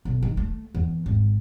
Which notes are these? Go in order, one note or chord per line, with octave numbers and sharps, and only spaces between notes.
B1
D#3
A3
E2
G#1